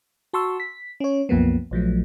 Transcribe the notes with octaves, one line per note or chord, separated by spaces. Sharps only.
F#4 A5 C6 C#6 E6
B6
C#4 C#5
C2 F#2 F3 A#3 B3
A#1 F3 F#3 A3